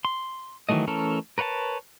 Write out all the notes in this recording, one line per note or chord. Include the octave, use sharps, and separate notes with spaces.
C6
D#3 E3 F#3 A3 D#5
E3 A3 C#4 A4 A#4
A#4 B4 C#5 F#5 A5